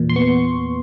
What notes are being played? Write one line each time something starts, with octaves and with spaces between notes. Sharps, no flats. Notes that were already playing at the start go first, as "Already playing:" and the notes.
Already playing: E2 A#2
C6
B3 C#6